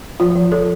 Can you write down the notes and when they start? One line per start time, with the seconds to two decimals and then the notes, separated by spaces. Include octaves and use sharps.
0.20 F3 F4
0.36 F3
0.52 F3 A4